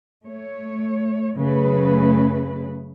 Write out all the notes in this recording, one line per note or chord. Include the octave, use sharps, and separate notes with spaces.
A3 C#5
F#2 C#3 A3 B4